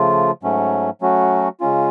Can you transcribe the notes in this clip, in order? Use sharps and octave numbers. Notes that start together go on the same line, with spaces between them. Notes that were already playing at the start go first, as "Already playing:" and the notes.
Already playing: C#3 F3 A3 F4
G#2 F#3 A3 C#4
F#3 A3 C#4 F#4
C#3 G#3 C#4 F4